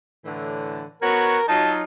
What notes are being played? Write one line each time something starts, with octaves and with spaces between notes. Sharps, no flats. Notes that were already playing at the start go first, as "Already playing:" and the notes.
A2 D3 E3
B3 F#4 A#4 C#5
F#3 D#4 F4 A5